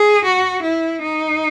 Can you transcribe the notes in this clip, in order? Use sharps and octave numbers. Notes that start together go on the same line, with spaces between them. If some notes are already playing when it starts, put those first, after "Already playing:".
Already playing: G#4
F#4
E4
D#4